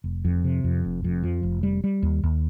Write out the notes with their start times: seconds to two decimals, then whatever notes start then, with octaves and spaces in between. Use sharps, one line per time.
0.04 F1
0.25 F2
0.44 C3
0.64 F2
0.84 F1
1.04 F2
1.23 F3
1.43 F1
1.63 G3
1.84 G3
2.03 D#2
2.24 D#2